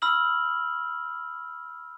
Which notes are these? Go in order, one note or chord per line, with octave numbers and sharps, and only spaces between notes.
B5 E6 F6 F#7